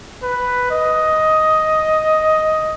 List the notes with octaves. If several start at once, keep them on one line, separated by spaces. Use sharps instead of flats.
B4
D#5